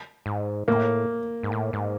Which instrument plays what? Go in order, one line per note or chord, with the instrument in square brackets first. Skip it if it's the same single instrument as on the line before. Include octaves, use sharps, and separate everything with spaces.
[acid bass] G#2
[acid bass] A2 [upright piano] A#3
[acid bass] G#2
A2
G#2